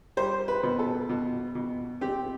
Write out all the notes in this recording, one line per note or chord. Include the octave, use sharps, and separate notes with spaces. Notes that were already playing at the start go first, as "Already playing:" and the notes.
G3 C5
B4
B2
A4
B2
B2
C4 G4